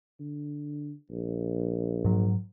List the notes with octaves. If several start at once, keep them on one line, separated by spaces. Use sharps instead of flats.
D3
A#1
G#2 F#3